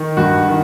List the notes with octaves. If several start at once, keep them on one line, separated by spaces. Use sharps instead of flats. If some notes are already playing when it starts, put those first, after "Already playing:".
Already playing: D#3
G2 F#4
D#3